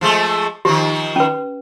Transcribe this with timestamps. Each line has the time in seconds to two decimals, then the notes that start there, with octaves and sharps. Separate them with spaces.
0.01 F3 G#3 A3
0.65 D#3 F3 G4
1.16 C#4 B4